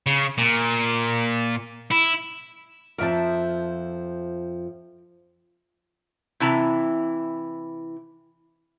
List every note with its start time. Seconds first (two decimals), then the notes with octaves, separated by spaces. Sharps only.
0.07 C#3
0.38 A#2
1.91 E4
2.98 F2 F3 A#4 E5 A5
6.40 C3 E3 E4 A5 A#5